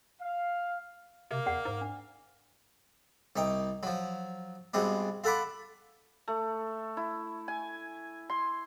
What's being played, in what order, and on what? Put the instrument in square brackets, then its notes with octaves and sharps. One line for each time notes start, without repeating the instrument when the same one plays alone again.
[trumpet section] F5
[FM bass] C3 [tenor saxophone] A#3
[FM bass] E2 [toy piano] D5 F#5
[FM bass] G#2
[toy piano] D4
[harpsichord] C2 D#4 G5
F3 F#3
G2 B2 G#3 C4 D4
F4 A4 F#5 B5 D6
[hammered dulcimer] A3
E4
G#5
C6